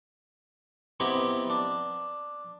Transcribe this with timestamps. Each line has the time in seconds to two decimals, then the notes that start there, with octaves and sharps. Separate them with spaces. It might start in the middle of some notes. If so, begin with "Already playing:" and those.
1.00 B3 C4 D#4 E4 G4
1.50 D4